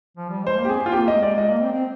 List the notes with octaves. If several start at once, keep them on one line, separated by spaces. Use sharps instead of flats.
F3
G3
G#3 C5
A#3
G4
C4 G#4
C4
F4
A#3 G4
D#5
A#3
G#3
D5
G#3 D#5
A#3
C4
C4